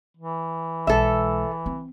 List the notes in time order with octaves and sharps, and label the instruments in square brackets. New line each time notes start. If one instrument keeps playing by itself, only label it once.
[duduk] E3
[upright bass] B1 G#3 [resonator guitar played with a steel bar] A4 E5
[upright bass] C4